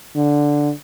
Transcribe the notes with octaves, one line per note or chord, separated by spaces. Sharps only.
D3